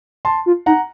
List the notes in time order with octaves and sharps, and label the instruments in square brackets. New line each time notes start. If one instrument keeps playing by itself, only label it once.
[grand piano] A5 C6
[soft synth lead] F4
[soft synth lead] D#4 [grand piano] F#5 A#5